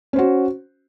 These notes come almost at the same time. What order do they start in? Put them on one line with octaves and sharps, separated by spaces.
C#4 C5 F#4